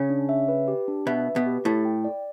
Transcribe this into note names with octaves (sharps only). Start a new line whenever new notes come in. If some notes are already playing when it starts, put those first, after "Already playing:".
Already playing: C#3 C#4
D4
E5
B4
G4
D4
B2 B3 E5
B4
B2 B3
G4
A2 A3 E4
G5
D5